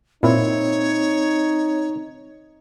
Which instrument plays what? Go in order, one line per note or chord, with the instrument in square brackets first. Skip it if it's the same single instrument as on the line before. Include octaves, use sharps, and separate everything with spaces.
[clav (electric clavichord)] A#2 E4 [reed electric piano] C4 [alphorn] D#4 [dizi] C#5